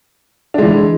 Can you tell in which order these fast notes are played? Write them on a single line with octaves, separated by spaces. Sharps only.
D4 G#3 E3